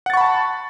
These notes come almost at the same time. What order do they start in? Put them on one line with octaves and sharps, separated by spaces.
F#5 A6 C#6 B5 A5